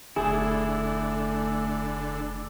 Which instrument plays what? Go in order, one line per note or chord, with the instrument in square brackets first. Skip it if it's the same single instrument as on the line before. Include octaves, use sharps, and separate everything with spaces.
[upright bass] F1 [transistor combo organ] D3 [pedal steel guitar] A3 E4 [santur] G#4